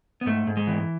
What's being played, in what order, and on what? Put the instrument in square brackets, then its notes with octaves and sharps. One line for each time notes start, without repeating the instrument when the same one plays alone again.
[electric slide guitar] B3
G#2 A3
G#2
G#3
E3